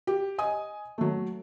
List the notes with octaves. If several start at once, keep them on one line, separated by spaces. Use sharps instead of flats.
G4
D#5 G#5 D#6
F#3 A3